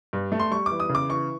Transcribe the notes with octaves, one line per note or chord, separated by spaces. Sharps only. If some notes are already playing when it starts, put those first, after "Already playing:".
G2
A3
C6
G3 C#6
E3 D6
D#6
C#3
D6
E3 C#6